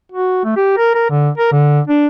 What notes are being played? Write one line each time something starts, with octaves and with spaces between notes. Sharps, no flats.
F#4
A3
G4
A#4
A#4
D3
A#4
D3
D4